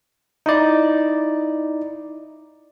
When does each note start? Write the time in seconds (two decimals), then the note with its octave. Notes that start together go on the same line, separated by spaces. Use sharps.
0.46 D#4 E4 D5